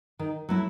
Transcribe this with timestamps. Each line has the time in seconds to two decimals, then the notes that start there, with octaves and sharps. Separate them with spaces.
0.19 D#3
0.49 F#3 A3 E4